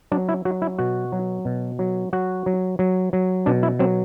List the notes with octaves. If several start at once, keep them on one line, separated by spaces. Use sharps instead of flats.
F#3 D4
E4
F#3 F#4
E4
B2 F#4
F#3
B2
F#3
F#3 F#4
F#3
F#3
F#3
B2 D4
E4
F#3 C4